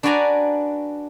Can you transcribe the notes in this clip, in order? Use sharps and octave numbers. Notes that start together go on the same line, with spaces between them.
D4 F#4 B4 D5 G#5 A#5